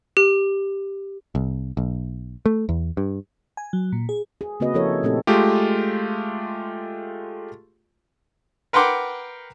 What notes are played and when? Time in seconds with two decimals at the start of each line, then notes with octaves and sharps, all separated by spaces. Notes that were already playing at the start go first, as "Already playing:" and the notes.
0.17 G4
1.35 C2
1.77 B1
2.46 A3
2.69 E2
2.97 G2
3.57 G#5
3.73 F#3
3.93 A#2
4.09 G#4
4.41 G#4
4.60 C#3 A#3 C4 F#4 B4 D#5
4.74 F3 E4 A4 A#4 C#5
5.03 A#2 A3 C4 D#4 G4 A4
5.27 G#3 A3 F4 G4
8.73 A#4 B4 F#5 G5 C6 D6